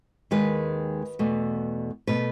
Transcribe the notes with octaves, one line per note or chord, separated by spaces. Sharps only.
D#2 D#3 G#3 B4
E2 B2 A3
B2 A3 B4